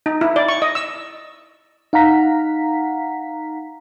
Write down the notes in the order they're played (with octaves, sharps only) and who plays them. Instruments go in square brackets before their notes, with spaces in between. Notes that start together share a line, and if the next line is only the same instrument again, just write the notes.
[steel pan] D#4
E4
D5
C#6
D#5
E6
[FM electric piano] D#4 F5 F#5 A#5 B6